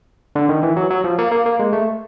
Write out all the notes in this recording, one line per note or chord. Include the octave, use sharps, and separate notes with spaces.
D3
D#3
E3
F#3
F#3
F3
A#3
A#3
A#3
G#3
A3